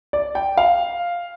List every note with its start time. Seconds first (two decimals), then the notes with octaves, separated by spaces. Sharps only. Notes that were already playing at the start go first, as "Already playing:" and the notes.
0.13 D5
0.35 G5
0.57 F5